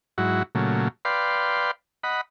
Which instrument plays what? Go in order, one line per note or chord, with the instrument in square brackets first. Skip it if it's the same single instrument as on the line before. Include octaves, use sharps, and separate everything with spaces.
[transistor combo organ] G#2 F#3 E4 F#4
A#2 C#3 F#3 A3
B4 D5 F5 G5 C6
D#5 F#5 B5